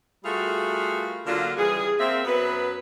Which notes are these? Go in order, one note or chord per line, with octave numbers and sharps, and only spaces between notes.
G3 A3 F4 F#4 G#4 A#4
D3 F#3 A#3 D4 F4 F#4
C#3 E3 G3 G#4
A#3 C4 E5
F#2 F#3 B3 B4